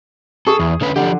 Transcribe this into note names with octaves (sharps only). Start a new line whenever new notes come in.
G#4 A4 C#6
E2
D3 C#4 B4
D3 F3 G4